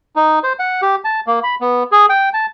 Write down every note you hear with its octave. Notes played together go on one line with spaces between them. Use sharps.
D#4
C5
F#5
G4
A5
A#3
B5
B3
G#4
G5
A5